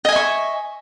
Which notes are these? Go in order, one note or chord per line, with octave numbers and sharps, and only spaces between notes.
D#5 E5 G#5 C#6